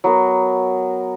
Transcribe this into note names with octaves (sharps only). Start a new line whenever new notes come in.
F#3 B3 A#4